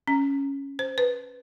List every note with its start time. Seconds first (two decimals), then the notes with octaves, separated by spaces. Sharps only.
0.07 C#4
0.79 C5
0.98 B4